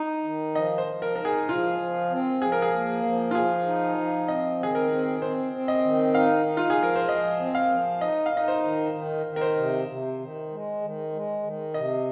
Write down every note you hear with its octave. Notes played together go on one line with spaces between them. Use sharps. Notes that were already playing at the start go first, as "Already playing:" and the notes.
Already playing: D#4
D#3
F3 D#5
C5
F3
A#4
D#4 A#4
G#4
F3 F4
F3
C4
F3 G#4
A#4
G#4
A#3
F3
F4
F3 G#4
D#4
F3
C4 D#5
D#3 G#4
A#4
C4
C4 C5
C4
D#5
D#3
D#4 F5
D#4
F4
G#4
F3
A#4
C5
F3 D#5
C4
F5
F3
D#4 D#5
F5
D#4 D#5
C5
D#3
D#3
D#3
A#4
C5
C3
C3
D#3
G#3
D#3
G#3
D#3
C3 D#5